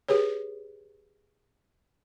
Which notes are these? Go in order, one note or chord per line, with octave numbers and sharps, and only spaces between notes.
G4 G#4 B4 C#5